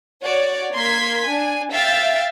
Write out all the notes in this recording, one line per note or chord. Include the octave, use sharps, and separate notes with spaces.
F#4 C#5 D5
A#3 C6 G#6 B6
D4 G#5
E5 F5 G5 A6